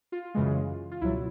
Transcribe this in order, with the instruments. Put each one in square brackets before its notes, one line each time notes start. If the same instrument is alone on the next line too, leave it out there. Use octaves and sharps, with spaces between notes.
[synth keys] F4
F#2 C#3 E3 G#3
F4
C#2 B2 F#3 E4